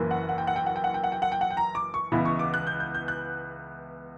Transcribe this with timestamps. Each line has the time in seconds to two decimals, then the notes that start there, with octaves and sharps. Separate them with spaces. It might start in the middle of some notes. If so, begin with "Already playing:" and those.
Already playing: F#1 F#2 E3 A#3
0.11 F#5
0.29 F#5
0.38 G5
0.47 F#5
0.56 G5
0.66 F#5
0.76 G5
0.84 F#5
0.94 G5
1.04 F#5
1.12 G5
1.22 F#5
1.32 G5
1.41 F#5
1.50 G5
1.57 A#5
1.75 D6
1.94 C#6
2.12 C#2 C#3 E3 B3 E4 B5
2.25 C#6
2.39 D6
2.54 F#6
2.67 G6
2.80 G6
2.95 G6
3.08 F#6